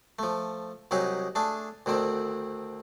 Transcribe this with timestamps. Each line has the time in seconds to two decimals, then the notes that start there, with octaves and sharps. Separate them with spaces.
0.19 F3 A3
0.91 C2 F#3 D#4 G4 G#4
1.35 A3 D4 G#4
1.86 D2 D3 D#3 C4